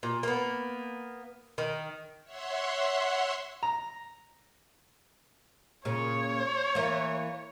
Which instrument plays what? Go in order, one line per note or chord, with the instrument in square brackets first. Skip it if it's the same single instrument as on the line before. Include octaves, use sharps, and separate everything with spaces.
[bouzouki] A#2
A#3 B3
D#3
[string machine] C#5 E5 F#5 C6
[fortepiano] A#5
[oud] A#2 C#3 [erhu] C#5
[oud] E3 A#3